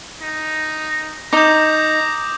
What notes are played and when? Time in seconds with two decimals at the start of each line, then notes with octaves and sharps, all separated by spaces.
0.22 D#4
1.33 D#4 A#5 D6 D#6 G6